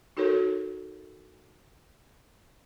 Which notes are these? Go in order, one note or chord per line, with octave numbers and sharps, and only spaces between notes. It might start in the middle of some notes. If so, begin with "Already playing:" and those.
D#4 F#4 A4 A#4 C#5